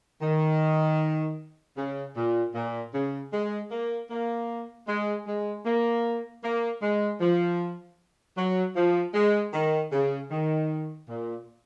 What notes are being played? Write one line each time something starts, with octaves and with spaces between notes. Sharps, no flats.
D#3
C#3
A#2
A#2
C#3
G#3
A#3
A#3
G#3
G#3
A#3
A#3
G#3
F3
F#3
F3
G#3
D#3
C#3
D#3
A#2